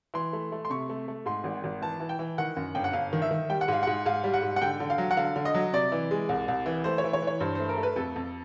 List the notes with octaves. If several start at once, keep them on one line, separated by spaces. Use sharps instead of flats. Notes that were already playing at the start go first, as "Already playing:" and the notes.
E3 C6
A3
A3
C6
C3 C#6
A3
A3
G#2 C6
G#1
G#1
E3 A5
E3
G5
E3
D#3 F#5
F#2
G1 G5
F#5
G1 F5
D#3
E5
D#3
G3 G5
F#5
G#2 F5
G#2 F#5
G#2 F5
G3
F#5
G#2
F#5
D3 G5
D3
F5
F#3
F#5
D3 F5
D3
D#5
F#3
C3 D5
E3
G#3
C2
C2
E3
A3 C5
C#5
E3
C#5
E3
C#5
G2 C5
A3 C5
A#4
A3
B4
F2 A4
F2